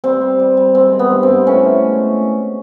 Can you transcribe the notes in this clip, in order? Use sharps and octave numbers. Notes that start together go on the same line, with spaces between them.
G3 C4
G3
G3
G3
G#3 C4
D#3
B3
G2
C4
G2
A2 C#4
A2
G#3